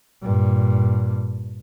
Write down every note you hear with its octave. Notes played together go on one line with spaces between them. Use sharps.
G2 A#2